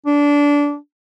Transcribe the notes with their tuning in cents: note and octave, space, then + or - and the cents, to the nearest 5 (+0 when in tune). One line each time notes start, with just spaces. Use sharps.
D4 -20